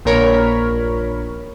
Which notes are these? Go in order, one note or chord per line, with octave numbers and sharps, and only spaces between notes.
A#1 A#2 A#4 C#5 B5